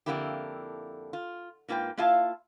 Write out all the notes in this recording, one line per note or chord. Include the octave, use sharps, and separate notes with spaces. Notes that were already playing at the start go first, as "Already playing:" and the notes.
F2 G#2 D3 A#3 E4 G4
F4
G#2 A#3 F4 B4 G5
A#3 E4 F4 E5 F5 A5